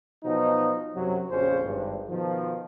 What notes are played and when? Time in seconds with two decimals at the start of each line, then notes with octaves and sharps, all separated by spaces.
0.24 B2 F3 F#3 D#4
0.94 F#2 C3 F#3
1.30 A#1 F2 C#3 C#4 C5
1.64 G#1 G2
2.09 B2 D#3 F3